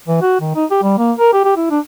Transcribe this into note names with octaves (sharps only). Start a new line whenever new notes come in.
E3
F#4
D#3
D#4
G4
G3
A#3
A#4
G4
G4
E4
D4